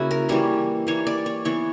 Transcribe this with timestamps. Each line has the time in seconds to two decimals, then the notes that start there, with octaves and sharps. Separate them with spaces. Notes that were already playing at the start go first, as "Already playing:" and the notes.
Already playing: C#3 A#3 E4 F#4
0.11 A#4
0.29 E3 G3 A#3 C#5
0.87 E3 G3 A#3 C#5
1.07 D5
1.26 C#5
1.45 E3 B3 C#5